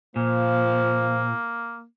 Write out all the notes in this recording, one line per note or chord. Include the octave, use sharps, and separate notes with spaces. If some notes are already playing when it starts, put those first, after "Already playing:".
A#2 F3 A#3